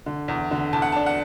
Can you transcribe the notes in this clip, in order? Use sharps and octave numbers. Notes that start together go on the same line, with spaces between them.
D3
E2
D3
E2 A5
F#5
A5
D4
F#5